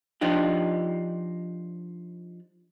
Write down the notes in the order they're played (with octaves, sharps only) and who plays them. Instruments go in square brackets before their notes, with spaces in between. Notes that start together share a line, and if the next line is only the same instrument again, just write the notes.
[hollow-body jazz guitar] F3 D4 D#4 G4